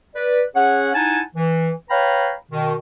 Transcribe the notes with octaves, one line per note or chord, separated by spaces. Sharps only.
B4 D5
C#4 G#4 C#5 F#5
D#4 E4 F#5 G#5 A5
E3
B4 C#5 F5 G5 A#5 B5
B2 D#3